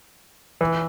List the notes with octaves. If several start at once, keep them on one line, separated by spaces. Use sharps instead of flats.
E3